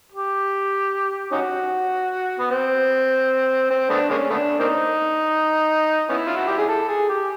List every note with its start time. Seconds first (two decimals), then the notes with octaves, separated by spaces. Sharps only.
0.12 G4
1.32 C#4 D#4 F#4
2.39 B3
2.51 C4
3.70 C4
3.90 A3 B3 D4
4.10 G#3 A#3 C#4
4.30 A3 B3 D4
4.60 A#3 C4 D#4
6.09 B3 C#4 E4
6.26 F4
6.37 F#4
6.47 G4
6.58 G#4
6.69 A4
6.88 G#4
7.09 G4